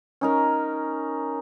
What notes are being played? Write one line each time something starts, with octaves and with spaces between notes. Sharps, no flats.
C#4 D#4 A#4